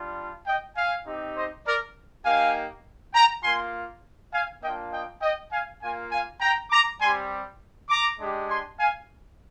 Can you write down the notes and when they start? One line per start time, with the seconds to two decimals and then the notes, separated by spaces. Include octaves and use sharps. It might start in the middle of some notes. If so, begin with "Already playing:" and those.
Already playing: G3 D4 F4
0.46 D#5 G5
0.76 F5 G#5
1.06 C4 D#4 G4
1.35 C5 D#5
1.66 A#4 D5
2.25 A#3 D#4 G4 F5 G#5
3.14 G5 A#5
3.44 A#3 F4 G#5 C6
4.33 F5 G#5
4.62 A#3 D4 F4 D#5 G5
4.92 D#5 G5
5.22 D#5 G5
5.52 F5 G#5
5.81 A#3 F4 F5 G#5
6.11 F5 G#5
6.41 G5 A#5
6.70 A#5 D6
7.01 G3 C4 G4 G#5 C6
7.89 A#5 D6
8.20 G#3 D4 G4
8.49 G#5 C6
8.79 F5 G#5